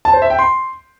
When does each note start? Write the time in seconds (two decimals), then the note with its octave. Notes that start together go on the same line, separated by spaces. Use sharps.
0.05 A5
0.13 C5
0.22 E5
0.30 G5
0.39 C6